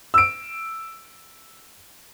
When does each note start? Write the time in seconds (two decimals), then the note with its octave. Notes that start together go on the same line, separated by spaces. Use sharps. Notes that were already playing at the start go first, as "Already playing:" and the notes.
0.14 E6 D7